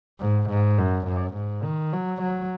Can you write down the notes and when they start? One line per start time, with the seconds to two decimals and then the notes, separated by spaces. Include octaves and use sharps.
0.20 G#2
0.50 G#2
0.78 F#2
1.07 F#2
1.35 G#2
1.64 D#3
1.93 F#3
2.21 F#3